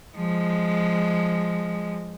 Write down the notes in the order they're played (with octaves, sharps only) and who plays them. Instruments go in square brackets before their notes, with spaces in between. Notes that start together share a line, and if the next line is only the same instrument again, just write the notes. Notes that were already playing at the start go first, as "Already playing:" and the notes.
[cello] F3 G#3